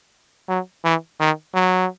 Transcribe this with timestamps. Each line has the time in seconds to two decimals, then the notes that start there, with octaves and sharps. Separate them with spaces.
0.48 F#3
0.84 E3
1.20 D#3
1.54 F#3